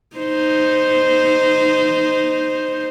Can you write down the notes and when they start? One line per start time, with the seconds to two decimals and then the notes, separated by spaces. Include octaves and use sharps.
0.17 D#4 C5